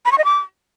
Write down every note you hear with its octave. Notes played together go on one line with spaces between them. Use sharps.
B5
C#6
D#5
D6